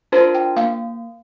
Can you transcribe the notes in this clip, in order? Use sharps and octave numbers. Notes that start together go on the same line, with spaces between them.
D4 F4 A#4 C5
G5
A#3 F5